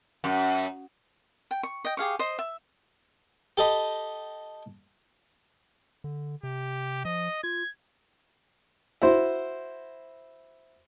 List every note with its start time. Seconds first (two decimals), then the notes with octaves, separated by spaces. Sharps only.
0.24 F#2
1.51 G5
1.63 C#6
1.85 D#5 G5
1.97 G4 G#4 F5 C#6
2.19 C5 D#5
2.39 E5
3.58 G4 A4 D#5 B5
6.04 D3
6.43 C3 G4
7.05 F3 D#5
7.44 F4 G#6
9.02 E4 F#4 C5